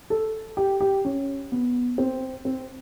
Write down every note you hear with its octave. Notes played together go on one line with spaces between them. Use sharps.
A4
G4
G4
C#4
B3
C4
C4